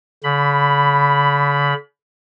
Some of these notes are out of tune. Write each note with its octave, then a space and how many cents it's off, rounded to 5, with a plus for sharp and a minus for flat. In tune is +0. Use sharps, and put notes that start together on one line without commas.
D3 -45 B5 +0